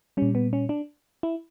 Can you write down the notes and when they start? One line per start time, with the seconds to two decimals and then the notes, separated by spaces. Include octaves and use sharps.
0.17 A#2 G3 C#4
0.35 B3
0.53 C#4
0.69 D4
1.23 E4